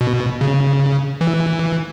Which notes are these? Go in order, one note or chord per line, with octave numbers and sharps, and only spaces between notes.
B2
C#3
E3